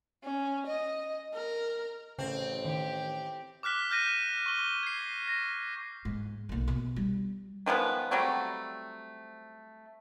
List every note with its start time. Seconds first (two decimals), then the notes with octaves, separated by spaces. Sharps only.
0.24 C#4
0.67 D#5
1.34 A#4
2.19 A1 C#3 C4
2.65 D#3 G4
3.63 D6 F6 F#6 B6 G7
3.91 F6 G6 A#6 D#7
4.46 C#6 G7
4.83 G#6 C7
5.28 A#6
6.05 G#2
6.49 B1 A#3
6.68 B2
6.96 G3
7.66 D#3 F3 G#3 B3
8.11 F#3 G3 A3 C4